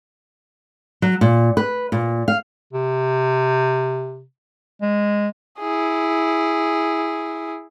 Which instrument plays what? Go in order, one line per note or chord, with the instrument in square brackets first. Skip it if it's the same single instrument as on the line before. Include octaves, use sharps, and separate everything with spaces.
[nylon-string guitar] F#3
A#2
B4
A#2
F5
[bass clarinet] C3
G#3
[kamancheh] E4 G#4